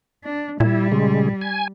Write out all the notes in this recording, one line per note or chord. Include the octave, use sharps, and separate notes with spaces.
D4
A#2 G3 E4
C#3 G#3
G#5